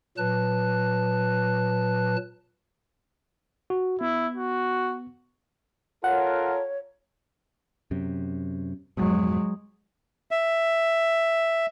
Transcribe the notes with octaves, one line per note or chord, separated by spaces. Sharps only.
A#2 F#3 B4 A5 F#6
F#4
B3 E4
F#4
F4 A4 A#4 C#5 F#5
F#2 C3
F2 G#2 B2 F#3 G#3
E5